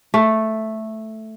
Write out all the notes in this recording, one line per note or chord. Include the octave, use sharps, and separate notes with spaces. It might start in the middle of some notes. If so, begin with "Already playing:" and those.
A3